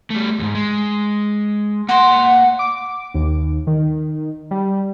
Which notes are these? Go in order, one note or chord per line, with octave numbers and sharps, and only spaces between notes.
G3 A3
D#2 G#2
G#3
A#3 F#5 C6
D6
D#2
D#3
G3